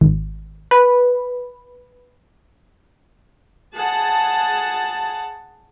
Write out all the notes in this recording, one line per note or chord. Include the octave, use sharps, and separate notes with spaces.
G#1
B4
G#4 F#5 A5